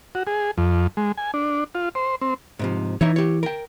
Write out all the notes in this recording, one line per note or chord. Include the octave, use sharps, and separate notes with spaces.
F#4
G#4
F2
G#3
G#5
D4
F4
C5
C4
G#2 C3 F3
E3 D#4 E4 C#5
G4 C#5
A#4 G5